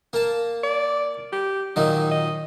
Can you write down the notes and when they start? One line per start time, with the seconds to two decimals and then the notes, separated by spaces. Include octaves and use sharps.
0.13 A#3 A5
0.64 D5
1.32 G4
1.76 A#2 D#3 F#3 D#4
2.11 D#5